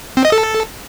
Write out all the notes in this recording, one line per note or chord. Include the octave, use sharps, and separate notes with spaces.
C4
D#5
A4